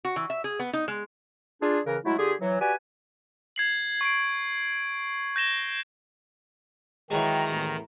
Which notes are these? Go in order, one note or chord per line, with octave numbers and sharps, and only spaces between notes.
F#4
E3
E5
G#4
B3
D#4
G#3
D4 F4 G#4
C#3 E3 A#4
F#3 G#3 A3 E4
D3 F4 G4 G#4
E3 F#3
F#4 G4 B4 D5 G#5
G#6 C7 F#7
C#6 C7 D7
G6 A#6 E7 G7
D#3 E3 F#3 G#3 G5 A#5
A1 E2